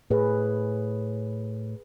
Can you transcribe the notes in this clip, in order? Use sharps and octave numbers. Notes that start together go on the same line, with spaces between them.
A2 G#4 B4